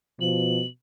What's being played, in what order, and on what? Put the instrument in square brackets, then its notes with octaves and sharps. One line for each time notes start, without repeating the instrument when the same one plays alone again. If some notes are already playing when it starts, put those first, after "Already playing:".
[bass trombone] B2 [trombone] F3 [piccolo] F#7